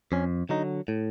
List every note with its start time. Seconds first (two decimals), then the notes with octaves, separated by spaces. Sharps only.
0.12 F2 C#4
0.49 D3 F#3 D#4
0.88 A2